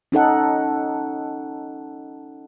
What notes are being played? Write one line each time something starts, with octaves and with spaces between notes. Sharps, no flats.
C#4 D#4 A4 F#5